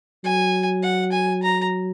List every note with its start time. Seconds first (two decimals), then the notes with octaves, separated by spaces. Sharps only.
0.24 F#3 G#5
0.83 F#5
1.12 G#5
1.43 A#5